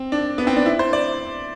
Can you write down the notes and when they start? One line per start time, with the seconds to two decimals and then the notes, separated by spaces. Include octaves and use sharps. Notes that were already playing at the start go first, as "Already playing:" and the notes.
Already playing: C4
0.12 D4
0.38 B3
0.47 C4
0.56 D4
0.66 E4
0.79 C5
0.93 D5